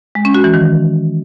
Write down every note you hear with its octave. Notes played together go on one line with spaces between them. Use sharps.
G#3
C#4
F#4
E3
D#3